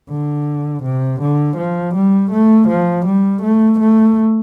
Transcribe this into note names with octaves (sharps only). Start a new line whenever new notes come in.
D3
C3
D3
F3
G3
A3
F3
G3
A3
A3